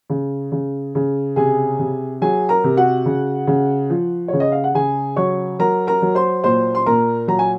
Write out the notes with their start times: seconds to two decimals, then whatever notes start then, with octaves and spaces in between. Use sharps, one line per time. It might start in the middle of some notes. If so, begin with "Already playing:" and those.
0.10 C#3
0.52 C#3
0.95 C#3
1.36 C3 G#4 G#5
1.79 C3
2.21 F#3 G#4 G#5
2.49 A#4 A#5
2.64 C3
2.77 F#4 F#5
3.06 C#3
3.47 C#3
3.90 F3
4.28 C#3 C#5
4.40 D#5
4.52 F5
4.64 F#5
4.74 C#3 G#4 G#5
5.16 F#3 C#5 C#6
5.59 F#3 A#4 A#5
5.87 A#4 A#5
6.02 F#3
6.15 C5 C6
6.44 A#2 C5 C6
6.75 C6
6.86 A#2 A#4 A#5
7.28 F#3 A#5
7.39 G#5